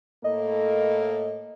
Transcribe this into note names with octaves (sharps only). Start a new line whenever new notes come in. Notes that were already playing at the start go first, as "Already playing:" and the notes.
A2 A#3 A4 D#5